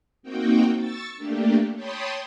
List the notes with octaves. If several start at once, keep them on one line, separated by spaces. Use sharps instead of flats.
A#3 C4 D#4 F#4 G5
C#6 E6 A6
A3 A#3 D4 G4
C#5 G5 A5 B5 C6 D#6